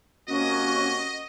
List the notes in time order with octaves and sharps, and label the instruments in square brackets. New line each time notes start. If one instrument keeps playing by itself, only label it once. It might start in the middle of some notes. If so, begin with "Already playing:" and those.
[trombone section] C3 A#3 F#4 [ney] C#4 [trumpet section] D#5